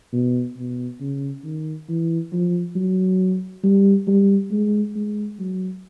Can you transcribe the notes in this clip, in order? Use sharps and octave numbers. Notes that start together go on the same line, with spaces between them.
B2
B2
C#3
D#3
E3
F3
F#3
G3
G3
G#3
G#3
F#3